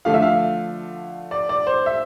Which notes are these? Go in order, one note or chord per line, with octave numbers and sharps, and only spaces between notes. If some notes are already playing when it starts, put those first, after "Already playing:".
D3 F3 A3 F5
E5
F5
D5
D5
C5
E5